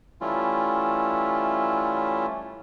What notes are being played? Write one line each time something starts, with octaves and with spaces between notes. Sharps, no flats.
E3 G3 A3 C#4 E4 F4